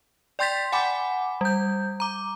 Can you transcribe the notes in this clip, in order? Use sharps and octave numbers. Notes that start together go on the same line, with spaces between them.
D5 G5 C6 G6 A6 B6
F#5 G#5 B5 D6
G3 G6
A#5 D6